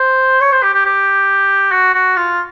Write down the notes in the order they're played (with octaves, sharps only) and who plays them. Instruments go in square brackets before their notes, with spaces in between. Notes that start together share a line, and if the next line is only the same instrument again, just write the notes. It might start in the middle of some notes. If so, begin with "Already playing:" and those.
Already playing: [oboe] C5
C#5
C5
G4
G4
G4
F#4
F#4
F4